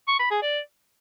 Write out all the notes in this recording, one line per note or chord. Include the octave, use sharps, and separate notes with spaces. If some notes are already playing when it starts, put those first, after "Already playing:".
C#6
B5
G#4
D5